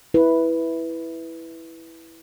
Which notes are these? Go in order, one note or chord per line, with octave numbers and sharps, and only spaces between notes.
E4 B4